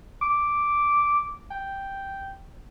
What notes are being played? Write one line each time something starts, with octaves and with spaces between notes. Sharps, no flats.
D6
G5